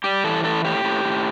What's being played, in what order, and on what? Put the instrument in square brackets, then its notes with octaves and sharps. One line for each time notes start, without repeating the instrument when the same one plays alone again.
[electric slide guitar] G3 G4
E3 A4
A2 A4
A2 G4
A2
A2